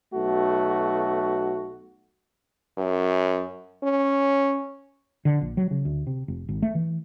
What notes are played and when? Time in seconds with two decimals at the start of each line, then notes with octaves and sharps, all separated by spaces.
0.13 B1 A3 F#4
2.78 F#2
3.83 C#4
5.25 D3
5.41 A#1
5.57 F#3
5.71 C#3
5.85 D2
6.07 C3
6.28 F1
6.49 G#1
6.62 A3
6.75 E3